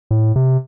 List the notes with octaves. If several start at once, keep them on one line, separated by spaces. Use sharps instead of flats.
A2
C3